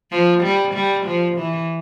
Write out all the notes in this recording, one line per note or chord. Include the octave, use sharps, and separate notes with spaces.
F3
G3
G3
F3
E3